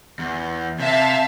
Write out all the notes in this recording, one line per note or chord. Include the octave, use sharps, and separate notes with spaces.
E2
C3 E5 F5 A5